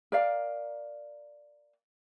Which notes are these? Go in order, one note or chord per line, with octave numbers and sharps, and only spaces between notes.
A#4 D5 F5